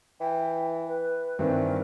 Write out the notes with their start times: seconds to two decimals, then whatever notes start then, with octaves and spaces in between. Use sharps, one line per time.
0.20 E3 G5
0.87 B4
1.39 G2 D#3 E3 C4
1.68 A#4